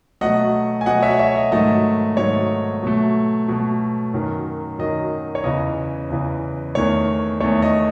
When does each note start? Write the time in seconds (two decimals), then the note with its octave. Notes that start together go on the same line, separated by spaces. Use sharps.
0.21 B2 F#3 A3 D#5 F#5
0.81 G#5
0.86 B2 F#3 A3 D#5 F#5
1.02 C#5 E5
1.19 C#5 E5
1.36 D#5
1.52 G#2 D#3 F#3 A3 D#5
2.17 G#2 D#3 F#3 A3 C#5
2.83 B2 F#3 A3
3.48 B2 F#3 A3
4.14 F#2 D#3 F#3
4.78 F#2 D#3 F#3 D#5
5.35 C#5
5.44 E2 C#3 E3 D#5
6.10 E2 C#3 E3
6.75 E2 D#3 A3 C#5
7.40 E2 D#3 A3 C#5
7.62 D#5